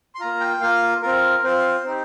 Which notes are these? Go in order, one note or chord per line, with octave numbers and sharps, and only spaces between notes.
C6
A#3 F4 A#5
G5
A#3 F4 F5
C4 F4 A#4
C4 F4 C5
C4 D#4 G4